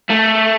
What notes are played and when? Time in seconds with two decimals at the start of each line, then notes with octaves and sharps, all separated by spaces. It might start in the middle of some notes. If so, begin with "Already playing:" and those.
0.10 A3